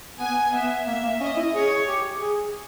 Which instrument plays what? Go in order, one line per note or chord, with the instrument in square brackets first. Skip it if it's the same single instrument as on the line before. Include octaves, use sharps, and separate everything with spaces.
[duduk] B3 [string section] G#5
[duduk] B3 [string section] E5
[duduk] A#3 [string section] E5
[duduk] A#3
[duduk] C#4 [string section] D#5
[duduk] E4
[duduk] G#4 [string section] C#5
[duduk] G4
G#4